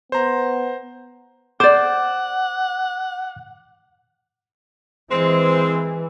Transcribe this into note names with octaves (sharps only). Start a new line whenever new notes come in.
B3 C5 A#5
C5 D5 F#5 D6
E3 G#3 C4